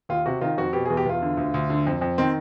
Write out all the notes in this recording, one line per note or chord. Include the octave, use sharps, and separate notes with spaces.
D#2 F4
C3 F#4
D#3 F4
F2 F#4
B2 G4
G#4
E2
G4
E2 F4
D3
D2
D2
D3
F2
F2
D#3 C4